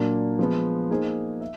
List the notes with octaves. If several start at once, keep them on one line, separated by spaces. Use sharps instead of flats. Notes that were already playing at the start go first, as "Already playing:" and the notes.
Already playing: A#2 F#3 A#3 D4
F3 G#3 B3
A#3 D#4 G#4 C5
E5